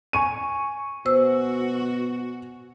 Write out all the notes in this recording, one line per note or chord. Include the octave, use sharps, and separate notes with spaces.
G#5 C#6 D#7
B2 F#4 C5 E6